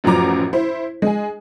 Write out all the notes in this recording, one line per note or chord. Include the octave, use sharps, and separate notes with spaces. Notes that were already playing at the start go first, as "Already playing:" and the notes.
A1 F#2 F3 F#3 A#5 D6
E4 C5
G#3 G#5